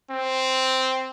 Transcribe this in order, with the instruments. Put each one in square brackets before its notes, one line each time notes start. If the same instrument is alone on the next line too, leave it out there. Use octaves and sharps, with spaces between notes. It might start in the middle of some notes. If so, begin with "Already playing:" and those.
[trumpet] C4